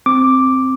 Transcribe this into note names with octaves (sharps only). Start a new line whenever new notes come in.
C4 D6